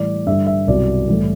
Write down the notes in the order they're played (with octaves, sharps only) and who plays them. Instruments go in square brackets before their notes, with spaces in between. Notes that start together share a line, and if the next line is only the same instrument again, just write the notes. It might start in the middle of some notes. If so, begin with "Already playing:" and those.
Already playing: [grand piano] A2 E3 G3 D5
G2 D3 G3 E5
E5
C2 B2 F#3 D5
A2 E3 G3